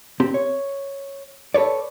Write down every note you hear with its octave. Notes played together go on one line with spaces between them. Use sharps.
C4 G4
C#5
A4 B4 C#5 D5